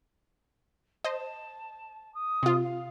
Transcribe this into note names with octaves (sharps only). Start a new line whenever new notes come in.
C5 D#5 A5
D#6
C3 F4
F5